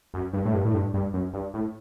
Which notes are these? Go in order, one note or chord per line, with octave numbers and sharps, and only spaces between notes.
F#2
G2
A2
G2
A2
G2
G2
F#2
G2
A2